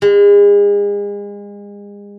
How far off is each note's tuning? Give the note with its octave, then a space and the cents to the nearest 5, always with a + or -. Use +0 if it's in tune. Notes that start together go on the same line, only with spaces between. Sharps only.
G#3 -35